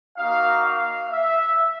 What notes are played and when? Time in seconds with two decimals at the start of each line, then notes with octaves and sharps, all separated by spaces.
0.18 A#3 D#4 F#4 F5
0.64 F5
1.10 E5